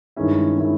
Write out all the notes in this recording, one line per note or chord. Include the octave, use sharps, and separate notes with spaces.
G2 D#3 G#3 C#4 E4
D#3 G#3 C#4 E4